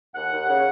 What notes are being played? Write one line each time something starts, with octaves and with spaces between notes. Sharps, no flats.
D#2 F#5
D#2
C#3